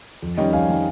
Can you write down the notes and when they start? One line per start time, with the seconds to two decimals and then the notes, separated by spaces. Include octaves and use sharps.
0.22 F2
0.37 D#3 G3 C#4 D#5 G5
0.53 F2 F5 G#5
0.69 D#3 G3 C#4